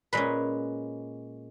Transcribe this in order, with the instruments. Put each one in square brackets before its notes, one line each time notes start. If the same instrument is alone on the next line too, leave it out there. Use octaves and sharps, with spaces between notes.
[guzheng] A#2 G#3 C#4 B4